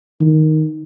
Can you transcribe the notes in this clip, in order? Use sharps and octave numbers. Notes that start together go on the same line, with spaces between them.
D#3